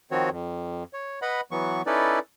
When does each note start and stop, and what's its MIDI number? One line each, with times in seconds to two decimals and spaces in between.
0.11 0.30 51
0.11 0.30 53
0.11 0.30 60
0.11 0.30 66
0.11 0.30 73
0.31 0.84 41
0.93 1.20 73
1.22 1.41 71
1.22 1.41 75
1.22 1.41 78
1.22 1.41 83
1.51 1.82 52
1.51 1.82 54
1.51 1.82 59
1.51 1.82 85
1.86 2.19 61
1.86 2.19 63
1.86 2.19 64
1.86 2.19 69
1.86 2.19 71
1.86 2.19 74